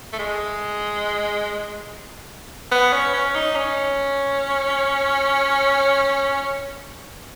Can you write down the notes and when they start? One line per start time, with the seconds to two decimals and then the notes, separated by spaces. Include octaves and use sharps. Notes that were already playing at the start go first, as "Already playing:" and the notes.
0.12 A3
0.19 G#3
2.71 B3
2.93 C#4
3.13 C#4
3.35 D#4
3.55 C#4